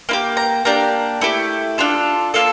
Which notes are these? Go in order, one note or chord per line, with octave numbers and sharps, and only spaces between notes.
A#3 E4 G4
A#5
A#3 D4 G4 A#5
A3 E4 G4
D4 F4 A4
A#3 F4 A4